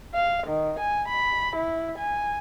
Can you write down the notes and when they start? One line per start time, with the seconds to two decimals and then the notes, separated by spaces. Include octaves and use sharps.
0.14 F5
0.47 D#3
0.79 G#5
1.08 B5
1.56 E4
1.98 G#5